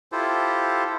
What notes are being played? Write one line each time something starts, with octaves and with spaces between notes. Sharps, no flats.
E4 F4 G4 A4 C5